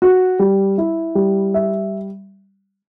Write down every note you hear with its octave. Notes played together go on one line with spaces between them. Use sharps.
F#4
G3
E4
G3
E5